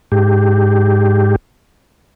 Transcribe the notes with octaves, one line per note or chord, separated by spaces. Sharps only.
G#2 G4